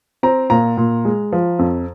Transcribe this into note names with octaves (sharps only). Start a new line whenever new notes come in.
C4 A#5
A#2 A#5
A#2
G#3
F3
F2